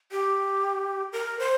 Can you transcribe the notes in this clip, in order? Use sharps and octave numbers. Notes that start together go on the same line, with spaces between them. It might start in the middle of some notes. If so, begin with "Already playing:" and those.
G4
A#4
C5